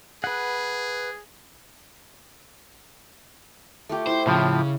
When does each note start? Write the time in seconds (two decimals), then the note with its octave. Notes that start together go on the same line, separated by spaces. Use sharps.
0.24 G#4 B4 F#5
3.89 A3 F4 G4
4.07 E4 C5
4.27 A2 C#3 F3